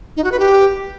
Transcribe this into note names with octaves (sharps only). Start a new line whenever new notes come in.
D#4
F#4
B4
G4